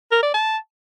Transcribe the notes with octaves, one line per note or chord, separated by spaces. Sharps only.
A#4
D5
A5